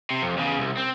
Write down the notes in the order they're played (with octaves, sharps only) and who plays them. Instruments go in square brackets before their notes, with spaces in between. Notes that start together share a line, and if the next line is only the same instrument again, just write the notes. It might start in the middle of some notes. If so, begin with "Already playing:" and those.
[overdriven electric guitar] C3
F2
E2 C#3
C2
C4